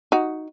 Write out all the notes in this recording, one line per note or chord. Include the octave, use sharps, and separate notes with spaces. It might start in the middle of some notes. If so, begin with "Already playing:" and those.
D#4 F#4